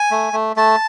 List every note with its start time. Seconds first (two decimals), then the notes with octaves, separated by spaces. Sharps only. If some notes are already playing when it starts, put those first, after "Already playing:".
Already playing: G#5
0.11 A3
0.33 A3
0.56 A3 A5